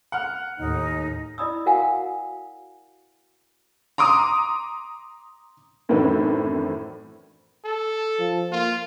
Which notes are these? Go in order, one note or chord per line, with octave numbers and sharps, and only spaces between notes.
F#5 F6
D#2 A2 D#4
E4 D5 D#5 B5 D#6 E6
F#4 A#4 F5 F#5 G#5
A#5 C6 D6 D#6
F#2 A2 D#3 E3 C4 D4
A4
F3
A#3 F4